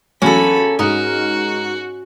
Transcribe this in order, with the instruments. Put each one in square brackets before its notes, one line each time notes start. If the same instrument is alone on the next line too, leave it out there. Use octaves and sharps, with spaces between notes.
[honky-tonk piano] E2 F#3 [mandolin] A#3 A4 [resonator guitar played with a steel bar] C#4 [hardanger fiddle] B5
[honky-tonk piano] G#2 [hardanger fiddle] F#4 [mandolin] A#4 D#5